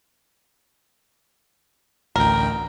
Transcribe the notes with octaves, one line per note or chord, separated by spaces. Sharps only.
A1 D2 A#4 G5